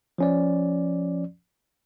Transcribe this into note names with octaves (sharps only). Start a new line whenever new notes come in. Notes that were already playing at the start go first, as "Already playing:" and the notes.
F3 C#4 D5